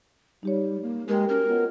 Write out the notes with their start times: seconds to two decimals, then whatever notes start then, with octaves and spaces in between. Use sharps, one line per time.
0.43 G3 D#4 G4 C#5
0.82 A#3
1.08 G#3 G4 A#4 G5
1.29 C#4 F#4 A#4
1.47 B3 F4 C#5 D#5